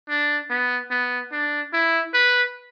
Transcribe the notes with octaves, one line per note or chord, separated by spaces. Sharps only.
D4
B3
B3
D4
E4
B4